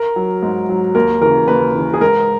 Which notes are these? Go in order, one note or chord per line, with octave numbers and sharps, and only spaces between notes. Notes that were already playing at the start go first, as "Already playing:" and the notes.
Already playing: A#4
F#3
G#2
F#3
D#2 A#4
C#3 E3 A#4
D#2 B4
C#3 E3
G#4
G#2 A#4